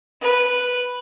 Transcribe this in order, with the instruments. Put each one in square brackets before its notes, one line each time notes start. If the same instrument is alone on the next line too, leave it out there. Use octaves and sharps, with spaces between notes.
[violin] B4